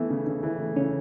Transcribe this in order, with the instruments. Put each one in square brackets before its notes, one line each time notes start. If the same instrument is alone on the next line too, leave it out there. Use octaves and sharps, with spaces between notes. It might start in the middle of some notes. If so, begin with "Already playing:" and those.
Already playing: [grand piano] E3 A3 [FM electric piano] B3
[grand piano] C#3
C#3
E3
A3
[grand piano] C#3 [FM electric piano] C#4